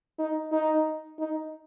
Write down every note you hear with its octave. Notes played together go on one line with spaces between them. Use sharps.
D#4
D#4
D#4